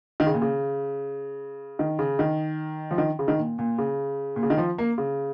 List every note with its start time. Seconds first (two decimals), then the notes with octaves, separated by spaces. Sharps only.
0.20 D#3
0.27 C#3
0.34 A#2
0.42 C#3
1.79 D#3
1.99 C#3
2.19 D#3
2.91 F3
2.98 D#3
3.19 C#3
3.28 D#3
3.39 A#2
3.59 A#2
3.78 C#3
4.36 A#2
4.43 C#3
4.50 D#3
4.58 F3
4.78 A#3
4.98 C#3